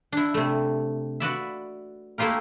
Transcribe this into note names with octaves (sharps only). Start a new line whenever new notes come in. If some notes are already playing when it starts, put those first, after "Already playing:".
D4 E4
C3 A3
F#4 B4 D5 E5
A3 A#3 E4 F4 G4 A#4